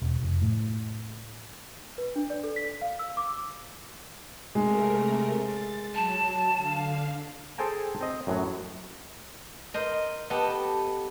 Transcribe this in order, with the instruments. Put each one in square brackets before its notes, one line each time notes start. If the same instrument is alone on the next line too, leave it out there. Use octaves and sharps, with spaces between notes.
[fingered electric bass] E1
F1
A2
[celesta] B4
D4
D5
A4
B6
F5
E6
D6
[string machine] C3 A3 A#4 [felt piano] G#3
[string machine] A6
[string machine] F#3 [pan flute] A5
[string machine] D3 F5
[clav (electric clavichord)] G#4 A4 C5 G5 G#5 A#5
C4 D#5
F#2 A2 F#3
[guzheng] A#4 C5 D#5
[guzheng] B3 [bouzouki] G4 A4 D#5